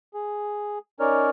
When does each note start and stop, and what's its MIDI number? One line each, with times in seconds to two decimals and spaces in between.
0.14 0.79 68
1.00 1.30 61
1.00 1.30 63
1.00 1.30 70
1.00 1.30 73
1.00 1.30 74
1.00 1.30 89